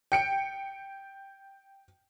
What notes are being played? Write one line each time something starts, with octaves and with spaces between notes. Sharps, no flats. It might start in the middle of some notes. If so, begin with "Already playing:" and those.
G5 C#7 D7